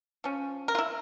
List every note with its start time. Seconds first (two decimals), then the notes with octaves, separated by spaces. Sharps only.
0.24 F3 C#4
0.68 A#4
0.75 F4
0.79 E4